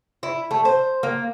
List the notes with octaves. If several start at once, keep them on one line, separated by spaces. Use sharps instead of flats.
E4
A3
C5
A#3